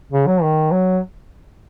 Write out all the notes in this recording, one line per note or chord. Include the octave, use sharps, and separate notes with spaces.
C#3
F#3
D#3
F#3